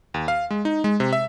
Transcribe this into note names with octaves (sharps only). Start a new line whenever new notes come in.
D#2
F5
G#3
D#4
G#3
C3
E5